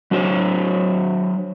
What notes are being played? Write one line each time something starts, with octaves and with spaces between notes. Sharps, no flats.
F#3 D4 F#4 C5 C#5